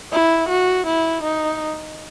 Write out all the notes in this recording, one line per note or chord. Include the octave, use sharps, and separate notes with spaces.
E4
F#4
E4
D#4